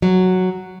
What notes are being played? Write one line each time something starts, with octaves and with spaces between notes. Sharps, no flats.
F#3